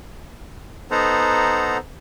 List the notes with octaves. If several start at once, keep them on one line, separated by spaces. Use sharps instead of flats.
B3 D#4 A4 C5 F#5 A#5